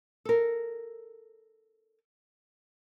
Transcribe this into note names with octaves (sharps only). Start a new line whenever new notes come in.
A4 A#4